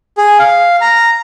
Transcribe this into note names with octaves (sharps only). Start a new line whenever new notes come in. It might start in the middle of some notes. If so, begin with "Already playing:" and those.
G#4
F5
A#5